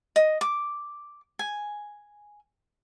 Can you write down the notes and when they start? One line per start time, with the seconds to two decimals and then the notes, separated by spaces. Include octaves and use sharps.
0.16 D#5
0.41 D6
1.39 G#5